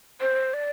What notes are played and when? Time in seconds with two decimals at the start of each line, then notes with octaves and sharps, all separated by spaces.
0.21 C5
0.54 D5